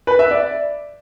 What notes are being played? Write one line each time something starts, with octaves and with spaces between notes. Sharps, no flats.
B4
E5
D5